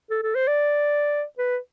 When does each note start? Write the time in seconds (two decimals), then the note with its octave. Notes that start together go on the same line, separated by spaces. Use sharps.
0.11 A4
0.23 A4
0.35 C5
0.48 D5
1.38 B4